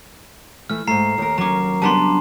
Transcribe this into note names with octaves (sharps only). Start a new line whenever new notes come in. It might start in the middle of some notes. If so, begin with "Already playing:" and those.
E3 A3 F6
G#2 A3 A#5 C7
D#2 A#4
F#3 C#4 A#5 D6
G3 B3 D4 A5 A#5 C6